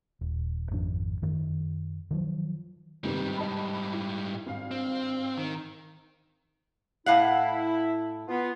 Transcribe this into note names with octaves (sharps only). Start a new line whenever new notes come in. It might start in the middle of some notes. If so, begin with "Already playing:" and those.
D#1
G#1 F2 D4
F#2 D#3
D#3 F3 F#3
G1 G#2 C3 D#3 G3
D#5 A5 B5
E4
G#1 G2 F5
C4
D#3
A2 E4 F5 F#5
B3 F4